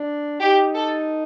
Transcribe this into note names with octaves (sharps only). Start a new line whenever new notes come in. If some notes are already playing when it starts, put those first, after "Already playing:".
Already playing: D4
D#4 G4
A4